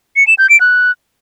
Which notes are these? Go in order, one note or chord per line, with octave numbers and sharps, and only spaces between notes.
C#7
E7
G6
D7
F#6